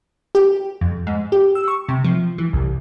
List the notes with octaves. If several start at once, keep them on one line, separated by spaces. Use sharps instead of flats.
G4
F2
G#2
G4
E6
C#6
C3
F3
E3
C2